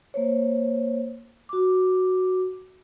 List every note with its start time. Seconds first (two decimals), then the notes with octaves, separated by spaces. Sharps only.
0.14 A#3 C5 C#5
1.49 F#4 D6